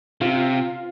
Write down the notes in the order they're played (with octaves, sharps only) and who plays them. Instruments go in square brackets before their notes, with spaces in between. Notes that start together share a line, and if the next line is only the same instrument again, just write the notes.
[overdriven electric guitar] C3 [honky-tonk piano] F4